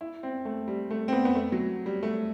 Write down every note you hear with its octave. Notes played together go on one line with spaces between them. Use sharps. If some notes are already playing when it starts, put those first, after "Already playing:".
E4
C4
A3
G3
A3
C4
B3
B3
A3
F#3
G3
A3